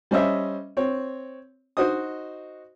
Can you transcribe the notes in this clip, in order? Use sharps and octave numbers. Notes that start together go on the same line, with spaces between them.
G3 C#4 C5 D#5 E5
C4 C#5
D#4 F#4 C5 D#5 D#6